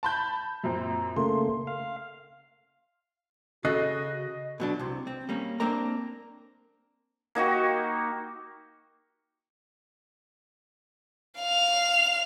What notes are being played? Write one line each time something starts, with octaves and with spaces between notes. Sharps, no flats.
A5 B5 G6
F#2 A#2 C4
C#3 A3 A#3 C6
F5
C#3 F#4 A4 D#5 F#6 C7
B2 F#3 D4
C2 C3
C4
G3 A#3 C#4
A#3 C4 D4 A#4 A#5
A#3 D#4 F#4 G4
F5 F7